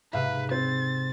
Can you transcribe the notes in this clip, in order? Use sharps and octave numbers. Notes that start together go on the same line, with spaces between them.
G#2 C3 B4 E5 F5
C4 A6